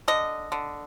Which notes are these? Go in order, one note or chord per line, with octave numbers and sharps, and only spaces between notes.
D3 D#5
D3